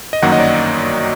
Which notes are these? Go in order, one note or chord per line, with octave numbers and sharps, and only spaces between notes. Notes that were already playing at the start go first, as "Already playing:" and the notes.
D#5
G1 F#2 D#3 F#3 A#3 F#5
D#5
D5